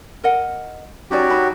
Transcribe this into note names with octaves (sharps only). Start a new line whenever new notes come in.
A#4 D#5 F#5
F#3 C#4 D#4 F#4 G4 D5
D#4 A5 B5